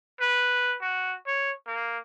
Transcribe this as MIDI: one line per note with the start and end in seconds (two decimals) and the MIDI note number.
0.20 0.75 71
0.81 1.15 66
1.27 1.51 73
1.67 1.98 58